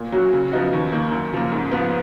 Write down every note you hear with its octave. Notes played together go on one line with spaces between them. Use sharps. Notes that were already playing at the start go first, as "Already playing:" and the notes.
Already playing: A#2
F#3 C#4 F#4
C#3
F3 B3 D#4 F#4
D#2
D#3 A#3
F#2
C#3 F3 A#3
G#2
F3 B3